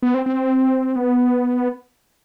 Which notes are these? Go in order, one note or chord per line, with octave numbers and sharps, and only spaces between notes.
B3
C4
C4
B3